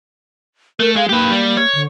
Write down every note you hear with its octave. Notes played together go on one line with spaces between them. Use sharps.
A3 A#4
G#3 F5
A#3 G4 B4
G3
C#5
D3